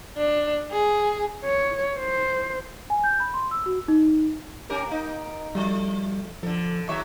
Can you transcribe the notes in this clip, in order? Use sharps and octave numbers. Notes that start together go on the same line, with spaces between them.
D4
G#4
C#5
C5
G#5
G6
B5
C6
E6
F#4
D#4
C#4 G4 A#4
A#3 D#4
F3 G3 A3
D3 F3 A4
D#2 F#3 E5 C#6